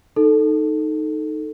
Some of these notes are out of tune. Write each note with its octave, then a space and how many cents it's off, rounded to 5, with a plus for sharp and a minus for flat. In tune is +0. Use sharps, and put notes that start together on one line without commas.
D#4 -5 A4 +0